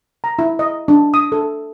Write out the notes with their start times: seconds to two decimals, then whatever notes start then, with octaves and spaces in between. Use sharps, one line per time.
0.24 A#5
0.39 E4
0.59 D#5
0.88 D4
1.14 D#6
1.32 A4